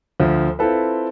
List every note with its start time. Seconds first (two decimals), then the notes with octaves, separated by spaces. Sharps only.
0.20 D2 F3
0.59 C4 E4 F4 A4 B4